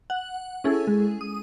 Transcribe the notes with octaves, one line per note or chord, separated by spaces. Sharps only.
F#5
C#4 E4 G#4 A4
G#3
D#6